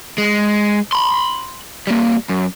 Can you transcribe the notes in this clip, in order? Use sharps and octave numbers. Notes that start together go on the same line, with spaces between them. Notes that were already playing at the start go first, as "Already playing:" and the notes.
G#3
B5 C6
G3 A#3
F#2